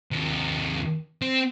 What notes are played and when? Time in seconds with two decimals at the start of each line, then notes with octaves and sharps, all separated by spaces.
0.11 D#2 C3
1.22 C4